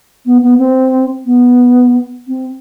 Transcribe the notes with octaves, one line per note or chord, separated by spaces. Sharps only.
B3
B3
C4
B3
C4